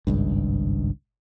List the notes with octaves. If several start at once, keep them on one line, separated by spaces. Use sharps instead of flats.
G#1 C#2 G2